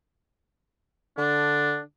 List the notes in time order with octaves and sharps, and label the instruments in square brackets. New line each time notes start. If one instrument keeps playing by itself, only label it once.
[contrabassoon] D3 [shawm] D4